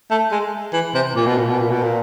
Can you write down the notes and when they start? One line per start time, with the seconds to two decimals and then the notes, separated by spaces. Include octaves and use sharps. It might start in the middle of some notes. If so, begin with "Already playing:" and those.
0.11 A3
0.32 G#3
0.73 E3
0.95 C3
1.16 A#2
1.26 B2
1.38 A#2
1.50 B2
1.60 A#2
1.71 B2
1.83 A#2